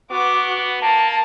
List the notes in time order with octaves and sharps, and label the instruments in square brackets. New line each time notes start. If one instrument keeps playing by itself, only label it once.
[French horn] B3 [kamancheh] F#4 D6
[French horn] A#3 [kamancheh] A5